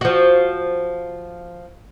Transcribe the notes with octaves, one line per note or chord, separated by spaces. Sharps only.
F3 F#4